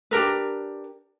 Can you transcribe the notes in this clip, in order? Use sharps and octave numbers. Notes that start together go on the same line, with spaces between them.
D4 G4 A#4 B4